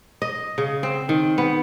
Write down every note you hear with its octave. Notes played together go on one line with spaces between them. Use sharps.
D#5
C#3
C4
D#3
B3